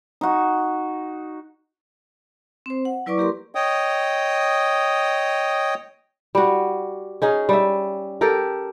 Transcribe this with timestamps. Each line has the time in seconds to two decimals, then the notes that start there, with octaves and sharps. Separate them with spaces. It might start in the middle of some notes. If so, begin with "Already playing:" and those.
0.21 D#4 F#4
2.66 C4 C5
2.85 F#5
3.06 F#3 E4 B4 D5 C#6 D6
3.18 A#3 G4 A#4 C6
3.55 C#5 D#5 G5 D#6
6.35 G3 F#4
7.22 C#4 D#4 G#4
7.49 G3 E5
8.21 G4 A4 A#4